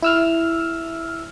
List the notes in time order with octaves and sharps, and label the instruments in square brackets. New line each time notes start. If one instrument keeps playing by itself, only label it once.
[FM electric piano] E4 E6 F6